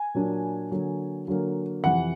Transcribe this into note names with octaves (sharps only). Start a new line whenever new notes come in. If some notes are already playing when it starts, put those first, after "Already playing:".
Already playing: G#5
A#2 F#3 A#3 D4
D3 F#3 A#3
D3 F#3 A#3
F2 C3 E3 F#5